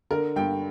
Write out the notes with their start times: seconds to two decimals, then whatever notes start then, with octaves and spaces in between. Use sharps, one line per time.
0.11 D3 A#4
0.36 G2 G5